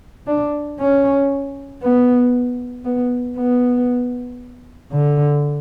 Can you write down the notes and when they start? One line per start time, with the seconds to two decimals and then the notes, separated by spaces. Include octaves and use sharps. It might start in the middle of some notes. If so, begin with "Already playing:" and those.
0.27 D4
0.79 C#4
1.82 B3
2.85 B3
3.37 B3
4.92 D3